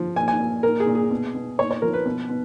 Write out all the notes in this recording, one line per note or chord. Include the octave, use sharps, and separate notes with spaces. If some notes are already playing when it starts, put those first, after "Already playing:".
Already playing: F3
A#2 G#5
G#5
A#2
A#2 A#4
G#4
A#2
G#4
B2
B2
A#2 C#5
C#5
F3 A#4
B4
B2
B2